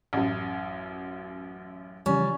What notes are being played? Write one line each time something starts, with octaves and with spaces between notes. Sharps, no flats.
A1 F#2
C#3 E3 F3 G3 C#4